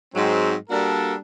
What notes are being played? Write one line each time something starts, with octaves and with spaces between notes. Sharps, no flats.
G#2 F#3 C4
G3 A#3 D4 F#4 A4 A#4